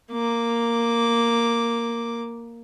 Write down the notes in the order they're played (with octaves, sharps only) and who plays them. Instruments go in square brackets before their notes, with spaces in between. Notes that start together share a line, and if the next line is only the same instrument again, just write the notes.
[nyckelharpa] A#3 D6